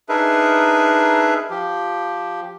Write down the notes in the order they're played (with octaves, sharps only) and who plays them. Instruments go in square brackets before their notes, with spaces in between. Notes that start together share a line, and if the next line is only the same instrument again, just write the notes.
[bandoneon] D4 D#4 G#4 A#4 B4 E5
F3 G4